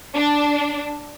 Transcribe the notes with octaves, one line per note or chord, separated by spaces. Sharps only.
D4